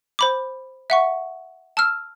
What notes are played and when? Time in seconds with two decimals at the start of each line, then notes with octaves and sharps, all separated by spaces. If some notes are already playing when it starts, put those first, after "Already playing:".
0.19 C5 B5 D6
0.90 E5 F#5 C#6
1.77 A5 E6 F6